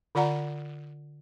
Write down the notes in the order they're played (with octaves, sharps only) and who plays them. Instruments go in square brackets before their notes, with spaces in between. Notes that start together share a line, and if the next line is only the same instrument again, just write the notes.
[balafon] D3 F4 D5 F#5 A#5